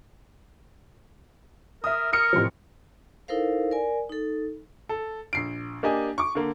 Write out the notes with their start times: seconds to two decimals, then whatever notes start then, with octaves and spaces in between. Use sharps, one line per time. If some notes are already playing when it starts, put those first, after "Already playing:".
1.84 A#4 E5 D#6
2.13 A#4 D#6 F6 C#7
2.33 A1 C3 F3
3.28 D#4 E4 A4 A#4 C5 F5
3.71 A#4 D5 G#5
4.09 D#4 A4
4.89 A4
5.33 A#1 C7 D7
5.83 A#3 D4 G4 D#5 G#5
6.18 C#6 D6
6.35 D3 A#3